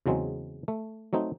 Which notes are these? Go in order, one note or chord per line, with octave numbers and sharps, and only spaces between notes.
E2 C#3 F#3 G#3 C4
A3
F#3 A3 C4 D#4